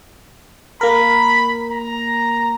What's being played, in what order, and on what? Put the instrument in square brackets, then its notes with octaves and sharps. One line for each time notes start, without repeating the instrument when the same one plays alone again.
[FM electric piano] A#3 A#4 [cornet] B5
[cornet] A#5